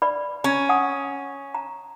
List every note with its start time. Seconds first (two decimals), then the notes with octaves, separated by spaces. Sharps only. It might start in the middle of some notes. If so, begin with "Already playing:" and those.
0.02 B4 D5 B5
0.44 C#4 A#5
0.69 F#5 G#5 D#6
1.55 A#5